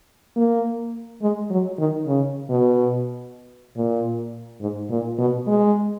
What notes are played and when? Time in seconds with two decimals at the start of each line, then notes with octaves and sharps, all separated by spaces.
0.36 A#3
1.22 G#3
1.51 F#3
1.79 D#3
2.07 C#3
2.50 B2
3.77 A#2
4.61 G#2
4.90 A#2
5.18 B2
5.47 G#3